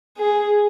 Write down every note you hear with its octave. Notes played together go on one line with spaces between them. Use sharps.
G#4